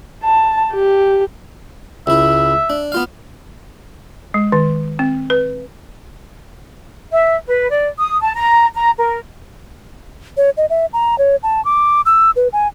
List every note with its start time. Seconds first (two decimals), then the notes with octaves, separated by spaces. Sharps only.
0.24 A5
0.73 G4
2.07 C#2 E4 E5
2.70 D4
2.92 B3 F4 F5
4.34 G#3
4.52 D#3
4.99 C4
5.30 B4
7.11 E5
7.46 B4
7.70 D5
7.99 D#6
8.21 A5
8.35 A#5
8.74 A#5
8.98 A#4
10.37 C#5
10.57 D#5
10.70 E5
10.93 A#5
11.18 C#5
11.43 A5
11.65 D6
12.06 E6
12.36 B4
12.53 G#5